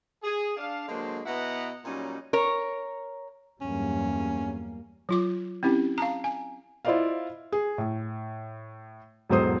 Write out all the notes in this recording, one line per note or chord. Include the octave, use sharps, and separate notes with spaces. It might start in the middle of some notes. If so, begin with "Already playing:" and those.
G#4
D4 F5
D3 F#3 G#3 A#3 D4 C5
B2 B3 E4 D#5 F#5 A#5
A#2 F#3 G3 C#4 D#4
A#4 C#5
E2 G2 F#3 G3 A#3 C#4
F#3 F4 D6
C4 C#4 E4 G4
F5 A5 A#5
G#5
E4 F4 C5 D5 D#5 F5
G#4
A2
E1 G#2 F#3 A4 C5 D#6